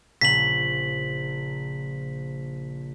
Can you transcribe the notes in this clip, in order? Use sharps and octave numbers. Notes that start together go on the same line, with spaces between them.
A#1 C#3 B6 F#7